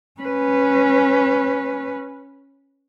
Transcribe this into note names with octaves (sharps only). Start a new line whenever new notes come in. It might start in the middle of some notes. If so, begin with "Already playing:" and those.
C#4 B4